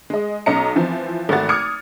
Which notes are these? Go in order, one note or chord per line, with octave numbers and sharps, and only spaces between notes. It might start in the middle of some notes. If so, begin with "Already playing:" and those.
G#3 D#5
B1 F#3 C#4 D#5 A#5 C#7
E3 F3 C4
G#1 A3 F#4 A6
D6 D#6 F6 G#6 C#7